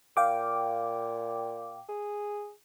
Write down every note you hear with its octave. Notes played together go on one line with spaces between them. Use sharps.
A#2 F5 G5 D6
G#4